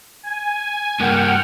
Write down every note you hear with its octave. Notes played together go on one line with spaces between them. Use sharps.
G#5
G2 A#3 F#5 G5 F6